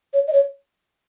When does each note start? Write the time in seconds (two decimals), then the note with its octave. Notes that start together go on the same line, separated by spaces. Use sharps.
0.13 C#5
0.28 D#5
0.33 C#5